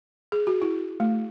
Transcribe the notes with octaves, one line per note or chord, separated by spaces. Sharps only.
G#4
F#4
E4
A3